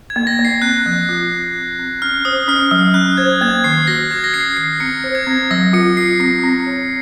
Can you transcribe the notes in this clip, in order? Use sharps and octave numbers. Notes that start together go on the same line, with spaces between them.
G#6
A#3
A#6
A#3
C7
C4 F#6
F3
F4
C4
C4
C4
C#4 F6
C5 D#6
C#4 F6
F#3 F6
C#4 F#6
C5 G#6
A#3 G#6
D#3 C7
F#4 A#6
F#4 G#6
A#6
C#4 C7
D#3 C7
C4 C#7
C5
G#6
C4
F#3 A#6
F4 C#7
F4 C7
C4 C7
C4
C#5